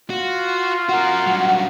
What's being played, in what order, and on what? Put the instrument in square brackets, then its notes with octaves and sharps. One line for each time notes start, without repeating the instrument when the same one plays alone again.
[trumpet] F4 [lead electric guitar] F#4
[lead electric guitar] F#4 A#4 [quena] F#5
[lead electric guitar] G2 F#3